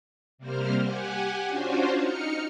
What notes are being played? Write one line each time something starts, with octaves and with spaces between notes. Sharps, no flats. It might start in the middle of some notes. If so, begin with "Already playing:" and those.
C3 G3 A#3 C5 F6
G4 F#5 G#5
C#4 D4 F4 F#4 C5
D#4 F6 C#7